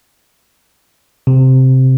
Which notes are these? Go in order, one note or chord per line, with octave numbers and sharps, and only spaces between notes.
C3